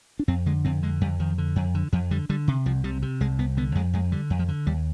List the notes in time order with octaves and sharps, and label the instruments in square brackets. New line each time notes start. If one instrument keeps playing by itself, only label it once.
[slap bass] D4
F2 C4
D3 G#3
F2 C4
D3 G#3
F2 G3
F2 D#3
D3
F2
D3
F2 F3
D3 G3
D3 G3
C3
C2 F3
C3 G3
C3
C2 G#3
C2 B3
D3 B3
F2 G#3
F2 G#3
D3 G3
F2
F3
D3
D#2 G3